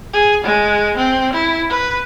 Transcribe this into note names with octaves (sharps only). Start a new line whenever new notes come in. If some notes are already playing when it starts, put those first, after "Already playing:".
G#4
G#3
C4
E4
B4